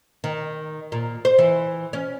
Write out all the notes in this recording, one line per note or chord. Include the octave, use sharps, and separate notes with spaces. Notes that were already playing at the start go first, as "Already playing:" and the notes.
D#3
A#2
C5
E3
C#4